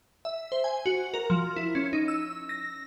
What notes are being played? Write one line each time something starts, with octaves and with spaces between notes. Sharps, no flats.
E5
C5
G#5
F#4
A#4
F3
E4
C#4
D#4
E6
A#6